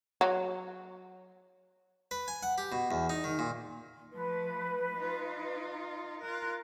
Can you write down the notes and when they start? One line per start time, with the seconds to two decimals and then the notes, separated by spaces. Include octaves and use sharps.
0.21 F#3
2.11 B4
2.28 G#5
2.43 F#5
2.58 G4
2.72 B2
2.91 E2
3.10 D#4
3.24 D#3
3.39 A#2
4.13 F3 A3 B4
4.95 D#4 F4
6.22 F4 A#4 F#6